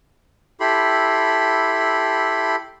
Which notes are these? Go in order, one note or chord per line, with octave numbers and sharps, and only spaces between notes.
E4 G4 A4 B5 C6